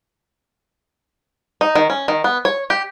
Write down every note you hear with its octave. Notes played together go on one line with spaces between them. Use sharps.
D#4
D#3
C#4
D#3
B3
C#5
G4